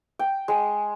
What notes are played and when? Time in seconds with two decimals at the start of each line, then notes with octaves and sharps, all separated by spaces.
0.19 G5
0.48 G#3